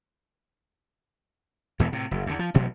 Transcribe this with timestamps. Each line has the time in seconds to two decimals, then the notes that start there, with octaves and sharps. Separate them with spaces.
1.80 E2 B2 E3 G#3
1.92 A2 C3
2.11 F#1
2.26 E2 D3
2.39 F3
2.54 A1 G2 B2 F#3